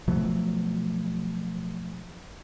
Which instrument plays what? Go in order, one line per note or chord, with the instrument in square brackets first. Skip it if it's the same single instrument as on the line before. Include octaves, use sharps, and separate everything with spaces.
[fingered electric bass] B2 F3 F#3 A3